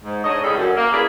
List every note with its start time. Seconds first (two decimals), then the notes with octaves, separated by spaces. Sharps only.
0.04 G#2
0.24 G#2 D4 C#5 D#5
0.42 F2 A2 C#3 G3 G#3 A4
0.57 F#2
0.76 A#3
0.92 C#4 E4 G#4 B4 D5